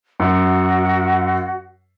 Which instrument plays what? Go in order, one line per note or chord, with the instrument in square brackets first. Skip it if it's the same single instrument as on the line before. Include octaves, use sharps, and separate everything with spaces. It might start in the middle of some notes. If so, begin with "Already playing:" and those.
[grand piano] F#2 [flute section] F#4 F#5